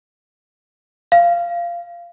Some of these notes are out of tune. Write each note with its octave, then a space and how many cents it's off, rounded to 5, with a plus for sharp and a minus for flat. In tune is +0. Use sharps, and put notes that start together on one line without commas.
F5 -15